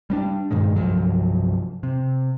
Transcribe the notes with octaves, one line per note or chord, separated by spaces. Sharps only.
G3 A#3 D4
G2 A#2 D#3 G#3
C2 G2 F3 F#3
C3